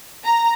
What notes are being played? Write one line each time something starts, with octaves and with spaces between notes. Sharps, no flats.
A#5